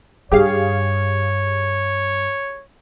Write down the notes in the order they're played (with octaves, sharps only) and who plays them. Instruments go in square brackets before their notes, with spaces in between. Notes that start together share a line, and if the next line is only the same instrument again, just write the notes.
[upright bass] G2 [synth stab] G4 G#4 F5 [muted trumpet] C#5